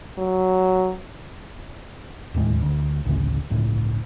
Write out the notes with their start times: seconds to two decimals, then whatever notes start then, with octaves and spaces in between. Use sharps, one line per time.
0.18 F#3
2.34 E1 D#2 A2 G#3
2.63 D2
3.05 A1 D2 C#3
3.50 G1 C#2 A2